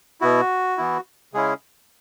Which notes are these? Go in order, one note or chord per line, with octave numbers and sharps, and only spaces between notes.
B2 B3 E4 F#4
E3 B3 E4
C#3 G#3 C#4 E4 G#4